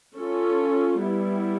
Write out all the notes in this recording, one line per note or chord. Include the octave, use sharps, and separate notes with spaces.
C#4 F4 A4
G3 B3 E4